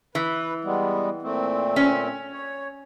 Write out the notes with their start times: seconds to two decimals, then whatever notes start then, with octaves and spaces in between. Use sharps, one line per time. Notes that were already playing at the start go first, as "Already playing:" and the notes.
0.15 E3 B4
0.64 G3 G#3 B3
1.22 A#2 A3 C4
1.76 C#4
2.32 C#5